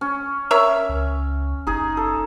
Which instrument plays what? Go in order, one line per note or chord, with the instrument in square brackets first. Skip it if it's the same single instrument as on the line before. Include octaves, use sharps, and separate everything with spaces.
[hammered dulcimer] C#4
[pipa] A#4 C#5 E5
[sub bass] C#2
[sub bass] F#1 [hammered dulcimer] D#4 G#4
[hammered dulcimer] A4